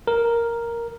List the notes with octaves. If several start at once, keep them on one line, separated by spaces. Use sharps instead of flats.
A#4